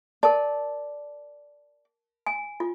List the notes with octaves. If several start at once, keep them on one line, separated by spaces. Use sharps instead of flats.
A#4 D5 A5
G#5
F4